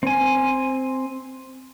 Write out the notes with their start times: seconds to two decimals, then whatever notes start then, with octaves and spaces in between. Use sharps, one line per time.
0.03 C4 G#5